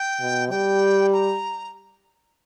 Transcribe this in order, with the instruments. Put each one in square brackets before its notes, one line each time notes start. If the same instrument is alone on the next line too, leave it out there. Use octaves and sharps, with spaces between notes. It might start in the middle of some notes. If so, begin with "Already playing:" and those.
Already playing: [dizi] G5
[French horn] B2
[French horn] G3 [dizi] G5
[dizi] A#5